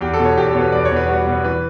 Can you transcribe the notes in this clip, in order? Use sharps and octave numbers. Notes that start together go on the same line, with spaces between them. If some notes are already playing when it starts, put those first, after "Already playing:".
E2 G4
A4
B2
C#5
E2 G4
A4
B2 C#5
B4
E2 D5
C#5
E2
B4
G3 F#4
B2
B4
E3 B4